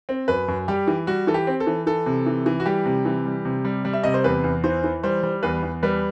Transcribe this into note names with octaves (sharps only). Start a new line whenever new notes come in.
C4
F#2 B4
F#2
G3 G4
E3
G3 F#4
E3 A4
G4
C4
A4
E3
E3 A4
C3
E3
E3
F#4
G3 G4
C3
E3
G3
C3
G3
G3
E5
C3 D#5
C5
E2 B4
E2
E3 C5
E3
G3 C5
G3
E2 B4
E2
G3 B4